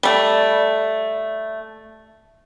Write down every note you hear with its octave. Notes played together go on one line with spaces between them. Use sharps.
G3 A3